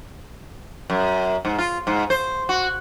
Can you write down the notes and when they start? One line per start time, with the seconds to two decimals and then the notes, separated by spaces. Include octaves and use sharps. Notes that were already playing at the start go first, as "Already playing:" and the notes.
0.90 F#2
1.45 G#2
1.59 F4
1.87 G#2
2.10 C5
2.49 F#4